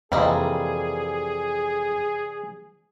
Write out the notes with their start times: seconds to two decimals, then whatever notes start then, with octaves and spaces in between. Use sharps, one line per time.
0.12 F2 C3 E3 G3 A#3 G#4 D#5